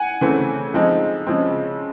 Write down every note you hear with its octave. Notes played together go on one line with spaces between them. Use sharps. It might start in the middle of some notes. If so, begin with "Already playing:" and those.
Already playing: F#5 G#5
C#3 E3 A3 C4
F3 G#3 C4 D#4
C#3 F3 G#3 C4